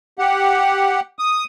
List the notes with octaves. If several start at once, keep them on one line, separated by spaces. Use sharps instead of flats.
G4 F#5
D#6